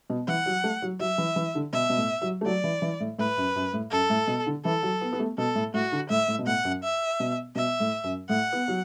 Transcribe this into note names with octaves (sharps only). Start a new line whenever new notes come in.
B2
E3 F#5
F#3
A3
F#3
F#3 E5
E3
E3
D3
B2 E5
B2
A2
F#3
A3
F#3 D5
E3
E3
A2
A2 B4
F#2
F#2
A2
F#2 A4
A2
B2
D3
E3 A4
F#3
B3
B3
A3
B2 A4
A2
A2 F#4
D3
A2 E5
A2
B2
A2 F#5
F#2
E5
B2
B2 E5
A2
F#2
A2 F#5
B3
F#3